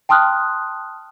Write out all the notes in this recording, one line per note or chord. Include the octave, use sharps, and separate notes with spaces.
G5 A5 C6 D#6 F6 F#6